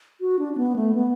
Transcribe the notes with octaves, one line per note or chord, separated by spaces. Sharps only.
F#4
D4
D4
B3
A3
B3